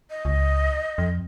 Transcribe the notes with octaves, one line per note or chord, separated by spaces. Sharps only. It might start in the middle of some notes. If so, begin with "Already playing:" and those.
D#5
C#2
F2